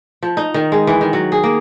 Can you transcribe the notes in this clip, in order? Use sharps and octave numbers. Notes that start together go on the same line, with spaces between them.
F3
D#4
D#3
G#3
E3
D#3
F#3
G#4
A#3